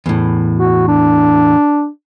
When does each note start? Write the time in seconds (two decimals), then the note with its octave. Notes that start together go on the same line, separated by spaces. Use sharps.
0.06 E2 A2
0.59 F#4
0.88 D4